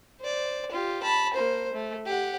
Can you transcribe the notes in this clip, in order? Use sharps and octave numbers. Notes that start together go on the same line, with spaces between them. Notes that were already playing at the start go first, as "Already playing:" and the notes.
C5 D5
F4 G4
A5 B5
A#3 C5
A3
G4 F#5